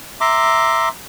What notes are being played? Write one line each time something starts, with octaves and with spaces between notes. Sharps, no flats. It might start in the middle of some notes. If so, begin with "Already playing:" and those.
E5 A#5 C6 D6